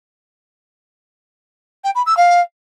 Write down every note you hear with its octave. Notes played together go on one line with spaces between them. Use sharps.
G5
B5
E6
F5